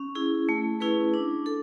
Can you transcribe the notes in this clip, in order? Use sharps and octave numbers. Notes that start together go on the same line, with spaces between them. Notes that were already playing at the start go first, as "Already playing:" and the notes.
Already playing: C#4
E4 G#4
A3
C#4 E4 G#4 B4
D4
A4